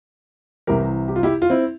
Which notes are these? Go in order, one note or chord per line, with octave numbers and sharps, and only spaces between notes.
C2 C3 E3 G4 A#4
G4
F4
E4 G4
F4
C4 E4